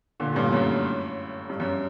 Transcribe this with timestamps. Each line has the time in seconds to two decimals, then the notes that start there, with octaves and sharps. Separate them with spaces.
0.20 A#2 D3
0.32 A2
0.36 G2 A#2
0.52 F#2 A2
1.49 G2
1.60 F#2